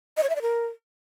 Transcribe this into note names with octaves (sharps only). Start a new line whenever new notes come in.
D#5
C#5
E5
D5
A#4